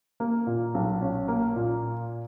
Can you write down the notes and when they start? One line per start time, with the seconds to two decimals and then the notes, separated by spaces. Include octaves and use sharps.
0.20 A#3
0.47 A#2
0.74 B1
1.02 C#4
1.28 A#3
1.56 A#2